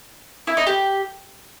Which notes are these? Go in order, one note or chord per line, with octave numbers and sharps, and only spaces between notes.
E4
D#4
G4